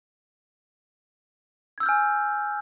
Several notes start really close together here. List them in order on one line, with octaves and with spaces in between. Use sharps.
G#6 E6 G6 F6 G#5